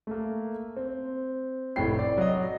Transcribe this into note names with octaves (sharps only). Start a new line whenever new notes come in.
A3 A#3
C4
F1 A2 G5 C7
D5
F#3 D#5